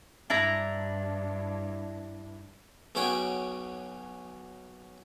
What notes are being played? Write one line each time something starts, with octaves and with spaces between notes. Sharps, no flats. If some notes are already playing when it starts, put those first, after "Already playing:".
G2 D4 E4 A#5
B1 C#3 C#4 F#4 C#5 G5